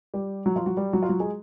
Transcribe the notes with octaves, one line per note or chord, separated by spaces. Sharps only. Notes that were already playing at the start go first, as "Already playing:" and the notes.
G3 G4
F#3 F#4
F3 F4
F#3 F#4
G3 G4
F#3 F#4
F4
F#3 F#4
G#3 G#4